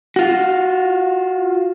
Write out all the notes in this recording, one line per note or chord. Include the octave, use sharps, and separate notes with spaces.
F4 F#4